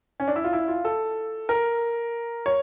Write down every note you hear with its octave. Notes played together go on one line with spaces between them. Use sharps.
C#4
D4
E4
F4
E4
F4
A4
A#4
C#5